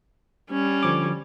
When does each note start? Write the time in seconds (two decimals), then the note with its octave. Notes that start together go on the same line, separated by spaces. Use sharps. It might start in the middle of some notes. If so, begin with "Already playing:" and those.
0.50 G3 C#4
0.83 D3 F3 D6